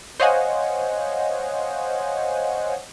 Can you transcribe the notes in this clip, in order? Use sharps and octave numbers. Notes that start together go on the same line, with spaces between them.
C5 C#5 D#5 F5 F#5 G#5